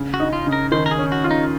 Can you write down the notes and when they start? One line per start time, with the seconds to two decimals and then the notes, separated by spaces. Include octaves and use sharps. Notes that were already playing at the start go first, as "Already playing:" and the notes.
Already playing: C#3
0.14 F#4
0.20 D#4
0.33 F4
0.46 C#3
0.52 A#4
0.72 D#3 C5
0.86 A#4
0.91 G#4
0.98 C#4
1.12 F#4
1.24 F4
1.31 D#4